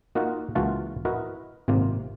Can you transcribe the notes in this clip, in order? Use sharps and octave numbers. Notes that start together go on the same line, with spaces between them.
A#3 D#4 F4 F#4 A#4 F#5
C#2 E3 A#3 F4 F#4 A5
E4 F#4 A#4 B4 D#5
G#1 C3 A#3 F4